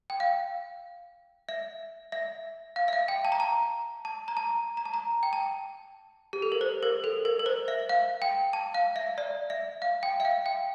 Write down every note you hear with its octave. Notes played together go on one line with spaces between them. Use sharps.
G5
F5
E5
E5
F5
E5
F5
G5
A5
A#5
A5
A5
A#5
A5
A#5
A5
A#5
G5
A5
G4
A4
A#4
C5
A#4
A4
A#4
A#4
C5
E5
F5
G5
A5
F5
E5
D5
E5
F5
G5
E5
F5
G5